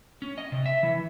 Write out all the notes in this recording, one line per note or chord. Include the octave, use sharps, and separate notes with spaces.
C#4
D#5
C3
E5
E3